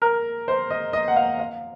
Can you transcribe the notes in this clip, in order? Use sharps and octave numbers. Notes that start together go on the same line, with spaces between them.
A#4
C5
D#5
D#5
F#5
F5
F5